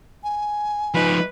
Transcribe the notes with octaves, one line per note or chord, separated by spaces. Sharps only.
G#5
F3 D#4 B4